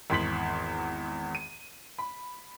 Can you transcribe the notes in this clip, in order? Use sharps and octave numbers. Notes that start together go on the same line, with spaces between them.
G#1 E2 C6 B6 F#7
D#7
B5